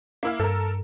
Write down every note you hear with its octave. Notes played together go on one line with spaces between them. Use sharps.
A#3 E4 F5
G2 A4 A#4